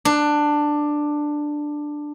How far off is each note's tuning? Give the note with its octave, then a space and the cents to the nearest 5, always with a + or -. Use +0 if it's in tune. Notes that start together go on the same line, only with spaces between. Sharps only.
D4 +10